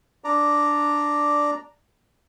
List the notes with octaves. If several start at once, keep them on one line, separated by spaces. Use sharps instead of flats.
D4 D5 A#5